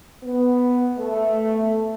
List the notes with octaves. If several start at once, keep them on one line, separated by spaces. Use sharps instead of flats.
B3
A3